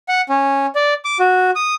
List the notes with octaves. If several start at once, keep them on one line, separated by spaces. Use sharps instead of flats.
F#5
C#4
D5
D6
F#4
D#6